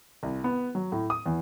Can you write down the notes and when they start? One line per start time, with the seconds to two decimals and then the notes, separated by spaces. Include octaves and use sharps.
0.23 C2
0.44 B3
0.75 F#3
0.92 A2
1.10 D#6
1.26 E2